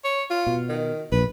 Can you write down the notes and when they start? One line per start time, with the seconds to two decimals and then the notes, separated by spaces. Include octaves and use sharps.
0.05 C#5
0.30 F4
0.47 B2
0.69 D#3
1.12 A#1 B4